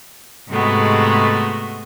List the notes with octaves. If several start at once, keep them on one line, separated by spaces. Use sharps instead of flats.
G#2 C3 G#3 A3 B3 F#4